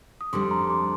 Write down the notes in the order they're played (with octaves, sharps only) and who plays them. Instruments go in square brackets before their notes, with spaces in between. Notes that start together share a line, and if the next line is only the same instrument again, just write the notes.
[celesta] D#6
[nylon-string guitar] F2 D3 G3 [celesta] C6 D6
[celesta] A#5 C6
C6 D6